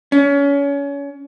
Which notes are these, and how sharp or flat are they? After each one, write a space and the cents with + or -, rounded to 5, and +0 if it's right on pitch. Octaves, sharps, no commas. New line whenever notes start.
C#4 +30